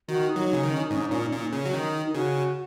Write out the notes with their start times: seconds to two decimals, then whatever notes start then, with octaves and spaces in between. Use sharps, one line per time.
0.09 D#3 F#4
0.29 D#4
0.36 F#3
0.50 C#3 D#4
0.63 D#3
0.70 C#4
0.80 D#4
0.89 G#2 C#4
0.97 D#4
1.07 C#4
1.11 A#2 D#4
1.24 C#4
1.32 A#2 D#4
1.42 C#4
1.53 C#3
1.65 F#3
1.73 D#3 D#4
2.06 D#4
2.14 C#3 F#4